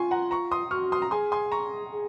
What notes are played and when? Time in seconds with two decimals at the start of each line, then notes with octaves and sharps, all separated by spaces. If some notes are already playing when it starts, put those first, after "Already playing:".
Already playing: F4 G#5 C6 C#6
0.11 F#5 A#5
0.31 A#5 C#6
0.51 C6 D#6
0.71 F#4 C#6 F6
0.92 C6 D#6
1.02 A#5
1.11 G#4 G#5 C6
1.32 G#5 C6
1.52 A#5 C#6
1.92 G#4